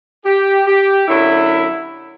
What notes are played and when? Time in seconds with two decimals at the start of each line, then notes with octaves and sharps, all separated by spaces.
0.25 G4
0.67 G4
1.08 F#2 D3 F#3 E4